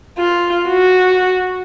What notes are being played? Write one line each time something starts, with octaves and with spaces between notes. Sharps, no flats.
F4
F#4